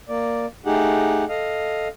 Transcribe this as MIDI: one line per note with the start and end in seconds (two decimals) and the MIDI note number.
0.09 0.46 58
0.09 0.46 74
0.66 1.25 57
0.66 1.25 63
0.66 1.25 67
0.66 1.25 68
0.66 1.25 78
1.29 1.88 69
1.29 1.88 75
1.29 1.88 77